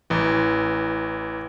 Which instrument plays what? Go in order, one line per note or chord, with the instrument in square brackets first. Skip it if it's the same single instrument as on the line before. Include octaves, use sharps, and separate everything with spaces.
[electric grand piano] A1 E3